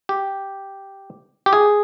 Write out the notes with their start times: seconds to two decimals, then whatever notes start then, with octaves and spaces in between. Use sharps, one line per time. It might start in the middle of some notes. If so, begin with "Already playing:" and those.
0.09 G4
1.46 G4
1.53 G#4